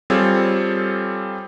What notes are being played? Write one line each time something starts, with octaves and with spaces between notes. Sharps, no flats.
G3 C4 F4 G#4 A4 C#5